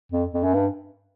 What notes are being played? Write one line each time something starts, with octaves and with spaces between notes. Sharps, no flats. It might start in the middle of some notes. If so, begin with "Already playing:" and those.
F2
F2
F#2
G2